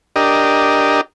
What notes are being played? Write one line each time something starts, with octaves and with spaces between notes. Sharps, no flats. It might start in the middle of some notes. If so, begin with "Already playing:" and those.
D4 G4 A#4 D#5